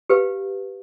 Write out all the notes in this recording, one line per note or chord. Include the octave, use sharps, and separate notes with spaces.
G4 B4 F5